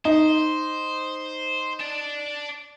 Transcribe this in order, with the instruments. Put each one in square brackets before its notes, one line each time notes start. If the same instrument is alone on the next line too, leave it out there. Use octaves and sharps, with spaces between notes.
[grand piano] D#4 [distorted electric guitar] C5
[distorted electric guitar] D5 A5